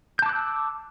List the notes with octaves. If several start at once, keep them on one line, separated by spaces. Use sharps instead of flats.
A5 D6 E6 F#6 G6